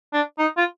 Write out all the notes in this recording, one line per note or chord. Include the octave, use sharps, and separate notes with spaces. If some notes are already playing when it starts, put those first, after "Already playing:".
D4
D#4
F4